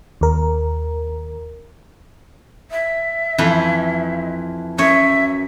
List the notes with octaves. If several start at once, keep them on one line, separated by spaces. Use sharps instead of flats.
D#2 A#4
E5
F2 E3 B4
F#2 C#5 E5